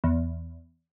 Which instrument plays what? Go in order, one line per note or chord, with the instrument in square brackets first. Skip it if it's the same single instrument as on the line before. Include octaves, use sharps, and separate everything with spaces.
[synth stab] E2